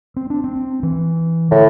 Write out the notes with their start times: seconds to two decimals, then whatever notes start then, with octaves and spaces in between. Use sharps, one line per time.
0.16 C4
0.30 D4
0.44 C4
0.83 E3
1.51 A2 D3